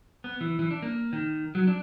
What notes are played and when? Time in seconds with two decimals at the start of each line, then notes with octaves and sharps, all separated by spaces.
0.24 B3
0.41 E3
0.59 E3
0.71 D4
0.82 A#3
1.13 D#3
1.55 F#3
1.67 D4